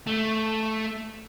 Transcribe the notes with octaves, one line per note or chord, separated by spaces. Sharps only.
A3